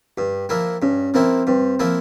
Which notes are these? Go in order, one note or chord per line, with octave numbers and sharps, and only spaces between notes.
G2 G4
F3 A#3 E4
G2 C#4
F3 A#3 C4 E4
G2 C4
F3 A#3 E4